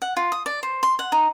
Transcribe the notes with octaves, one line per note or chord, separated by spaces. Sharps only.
F#5
F4
D#6
D5
C5
C6
F#5
D#4